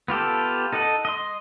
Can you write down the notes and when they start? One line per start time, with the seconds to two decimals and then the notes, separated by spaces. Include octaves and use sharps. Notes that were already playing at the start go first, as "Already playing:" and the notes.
0.08 B3 F4 G4 A4
0.73 D#4 A4 D#5 F#5
1.05 D#5 C6